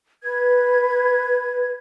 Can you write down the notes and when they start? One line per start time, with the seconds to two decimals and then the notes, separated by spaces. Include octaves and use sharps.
0.23 B4 G#6